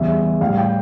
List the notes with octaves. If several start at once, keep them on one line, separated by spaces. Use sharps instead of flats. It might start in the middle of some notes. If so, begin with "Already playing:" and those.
Already playing: E2 C#3 G3 E5
A2 G3 F5
G5